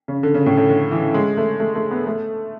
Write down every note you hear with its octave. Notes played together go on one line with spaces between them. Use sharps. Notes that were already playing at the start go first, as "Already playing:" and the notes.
C#3
D3
C#3
A2
A2
D3
E3
G#3
A3
A3
A3
B3
A3